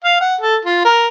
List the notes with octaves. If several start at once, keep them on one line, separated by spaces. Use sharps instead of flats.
F5
F#5
A4
F4
A#4